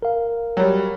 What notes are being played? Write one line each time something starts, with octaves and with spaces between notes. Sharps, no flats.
A#4 F5
F#3 G3